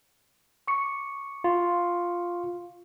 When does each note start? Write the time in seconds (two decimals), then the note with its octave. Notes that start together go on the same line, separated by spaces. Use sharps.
0.67 C#6 D6 C#7
1.44 F4